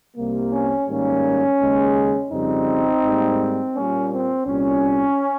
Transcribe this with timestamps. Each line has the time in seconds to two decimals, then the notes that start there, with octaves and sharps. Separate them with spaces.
0.17 C2 C3 G3 A#3
0.52 C#4
0.88 G#2 D#3 G3 A#3 C#4
1.60 D#2 C#3 G#3
2.31 F2 C#3 G3 C4 D#4
3.04 G#2 G3 A#3
3.75 A#2 G3 A#3 C#4
4.11 C4
4.47 C2 A#2 G3 C#4